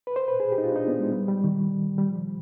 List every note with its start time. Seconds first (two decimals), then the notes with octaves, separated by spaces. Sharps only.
0.07 B4
0.16 C5
0.28 B4
0.40 G#4
0.52 G4
0.58 D#4
0.64 F4
0.72 D4
0.76 D#4
0.88 B3
1.00 G#3
1.12 G3
1.28 G3
1.44 D#3
1.98 G3
2.08 F3